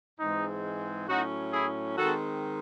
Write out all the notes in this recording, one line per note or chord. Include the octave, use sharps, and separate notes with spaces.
G#2 E3 G#3 C4 D#4
A2 F#3 C#4 D#4 F#4
E4 G#4
D#3 G#3 C4 F#4 A4